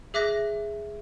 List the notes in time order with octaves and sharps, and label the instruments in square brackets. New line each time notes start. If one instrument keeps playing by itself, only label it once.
[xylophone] G#4 E5 D6 F#6 A#6